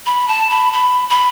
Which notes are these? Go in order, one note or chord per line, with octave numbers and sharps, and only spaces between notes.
B5
A5
B5
B5
B5